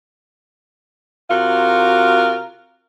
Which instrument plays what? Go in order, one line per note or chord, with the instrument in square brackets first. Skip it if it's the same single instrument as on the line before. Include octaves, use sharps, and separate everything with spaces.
[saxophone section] C3 F4 F#4 A#4